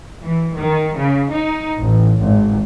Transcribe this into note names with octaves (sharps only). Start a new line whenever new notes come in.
E3
D#3
C#3
D#4
A1
G#1